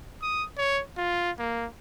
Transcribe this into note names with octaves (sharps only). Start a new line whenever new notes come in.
D#6
C#5
F4
A#3